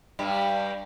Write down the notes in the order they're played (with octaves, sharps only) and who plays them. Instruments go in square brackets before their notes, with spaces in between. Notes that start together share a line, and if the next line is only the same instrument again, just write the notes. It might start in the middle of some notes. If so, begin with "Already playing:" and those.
[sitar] G2 G3